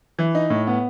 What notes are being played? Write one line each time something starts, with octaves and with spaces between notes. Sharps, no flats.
E3
D#4
A2
B3